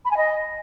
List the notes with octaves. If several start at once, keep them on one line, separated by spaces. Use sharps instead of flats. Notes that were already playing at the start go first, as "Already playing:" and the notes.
B5
G#5
D#5